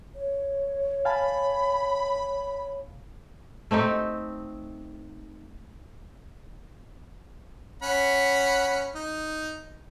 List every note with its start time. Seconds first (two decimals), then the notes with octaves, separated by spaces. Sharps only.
0.15 C#5
1.05 F5 G#5 A5 B5
3.71 A3 C4 D#4 G4
7.82 C#4 F#5 B5
8.95 D#4